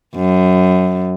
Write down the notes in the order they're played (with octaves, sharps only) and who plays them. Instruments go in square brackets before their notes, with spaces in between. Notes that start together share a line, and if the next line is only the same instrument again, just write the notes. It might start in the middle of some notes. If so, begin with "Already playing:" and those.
[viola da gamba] F#2